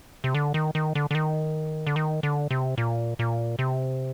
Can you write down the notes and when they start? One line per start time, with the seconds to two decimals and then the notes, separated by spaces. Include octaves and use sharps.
0.24 C3
0.35 D3
0.54 D#3
0.75 D#3
0.95 D3
1.11 D3
1.15 D#3
1.87 D3
1.96 D#3
2.23 D3
2.51 C3
2.78 A#2
3.19 A#2
3.59 C3